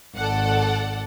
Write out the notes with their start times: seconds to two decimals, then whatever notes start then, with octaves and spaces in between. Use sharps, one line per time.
0.16 G#1 A4 D5 F#5